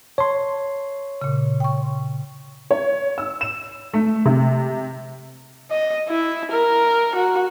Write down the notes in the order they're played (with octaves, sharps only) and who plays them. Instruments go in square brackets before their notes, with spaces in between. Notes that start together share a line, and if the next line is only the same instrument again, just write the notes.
[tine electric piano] C#5 C6 [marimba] A5
[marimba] A#2 C#3
G5 C#6
[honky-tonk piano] C#5
E6
E7
A3
C3
[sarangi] D#5
E4
A#4
F#4